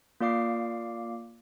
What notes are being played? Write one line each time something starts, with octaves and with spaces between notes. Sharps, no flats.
A#3 F4 D5 F5 D6 C7